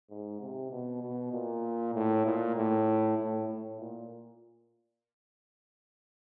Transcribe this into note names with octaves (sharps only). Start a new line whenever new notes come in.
G#2
C3
B2
B2
A#2
A2
A#2
A2
A2
A2
A#2